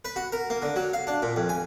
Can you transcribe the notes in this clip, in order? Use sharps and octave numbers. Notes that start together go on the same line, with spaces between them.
B4
F#4
A#4
A#3
D3
F#3
F5
D4
A#2
F2
G#5